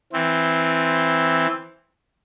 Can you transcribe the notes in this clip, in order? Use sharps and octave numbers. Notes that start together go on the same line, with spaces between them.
E3 C4